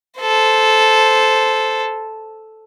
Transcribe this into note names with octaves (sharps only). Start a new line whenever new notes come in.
A4 C5